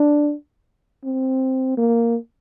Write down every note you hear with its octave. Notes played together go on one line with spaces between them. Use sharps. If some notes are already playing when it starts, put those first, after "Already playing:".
Already playing: D4
C4
A#3